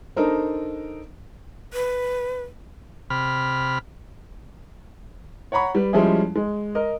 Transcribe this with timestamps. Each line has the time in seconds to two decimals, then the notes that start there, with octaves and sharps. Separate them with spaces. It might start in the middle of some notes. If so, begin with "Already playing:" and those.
0.16 D4 D#4 A4 A#4 C5
1.74 B4
3.10 C3 B5 F6
5.52 C#5 F#5 A#5 B5 C#6
5.75 G3 B4
5.93 F3 G3 G#3 C#4 E4 G#4
6.36 G#3
6.75 A#4 D#5